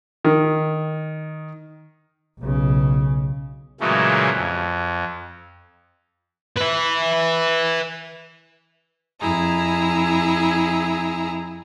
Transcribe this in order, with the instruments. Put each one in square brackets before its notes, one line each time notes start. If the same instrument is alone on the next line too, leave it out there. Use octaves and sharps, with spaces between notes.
[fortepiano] D#3
[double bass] B1 C#3
[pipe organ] A#2 C#3 E3 F#3 G#3 A3
F2
[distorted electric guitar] B4 E5
[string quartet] F2 E4 G#4 A#5